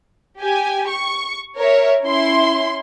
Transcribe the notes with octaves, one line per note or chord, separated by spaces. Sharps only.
G4 G#5
C#6
A#4 C#5 E5
C#4 E4 C6